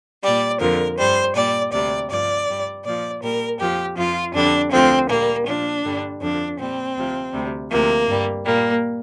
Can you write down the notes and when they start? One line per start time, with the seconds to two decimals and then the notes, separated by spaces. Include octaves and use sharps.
0.23 A#2 G3 D5
0.60 F2 D3 F3 A#4
0.97 G2 G3 C5
1.35 A#2 G3 D5
1.72 D2 C3 G3 D5
2.09 G2 F3 D5
2.47 G2 G3
2.84 A#2 F3 D5
3.21 A#2 G3 A#4
3.59 F2 F3 G4
3.96 F2 F3 F4
4.33 F2 D3 G3 D4
4.71 D2 D3 F3 C4
5.08 A#2 G3 A#3
5.46 A#2 F3 D4
5.83 G2 D3 G3
6.21 F2 D3 F3 D4
6.58 A#2 G3 C4
6.95 D2 C3 F3
7.33 D2 C3 G3
7.70 D2 C3 F3 A#3
8.07 G2 G3
8.45 A#2 G3 A#3